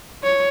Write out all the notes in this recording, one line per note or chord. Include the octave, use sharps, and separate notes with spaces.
C#5